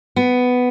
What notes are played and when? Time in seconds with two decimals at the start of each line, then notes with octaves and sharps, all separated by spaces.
0.16 B3